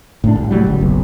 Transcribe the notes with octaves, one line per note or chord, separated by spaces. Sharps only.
A2 D4
C2
A2 F#3 G3
G1 C#2
F#1 B1